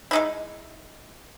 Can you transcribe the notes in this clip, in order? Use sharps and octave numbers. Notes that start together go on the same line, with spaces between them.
G#3 D#4 E4